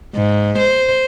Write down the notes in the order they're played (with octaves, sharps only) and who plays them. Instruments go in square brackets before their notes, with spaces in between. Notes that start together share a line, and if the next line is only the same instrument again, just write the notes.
[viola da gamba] G#2
C5